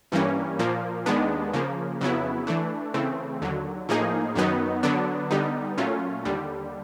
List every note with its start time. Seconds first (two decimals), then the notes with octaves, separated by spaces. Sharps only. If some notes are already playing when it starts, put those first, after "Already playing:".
0.12 G2 E3 G3 A#3 C#4
0.59 A#2 F3 A#3
1.06 D#2 D#3 G#3 B3 D4
1.53 C#3 F3 A#3
2.01 F2 C#3 F#3 B3 E4
2.47 E3 A3 D4
2.94 C#3 E3 A3 C4
3.42 D#2 D3 F#3
3.89 A2 F3 A#3 D#4 G#4
4.35 F#2 D#3 F#3 B3 D#4
4.83 D3 F#3 B3 D4
5.31 D3 G3 B3 D#4
5.78 A#2 F#3 A3 C#4 F4
6.25 D#2 D3 G3